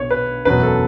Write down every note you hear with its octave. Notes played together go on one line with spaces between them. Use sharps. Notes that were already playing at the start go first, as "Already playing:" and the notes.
Already playing: B1 B2 C#5
B4
F#1 E2 B2 F#3 B4
A4